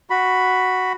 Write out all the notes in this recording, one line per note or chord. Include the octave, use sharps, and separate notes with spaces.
F#4 B5